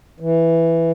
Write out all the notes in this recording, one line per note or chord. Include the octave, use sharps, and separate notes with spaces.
E3